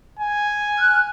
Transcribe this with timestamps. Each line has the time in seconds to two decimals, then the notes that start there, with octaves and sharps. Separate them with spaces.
0.19 G#5
0.78 F6 F#6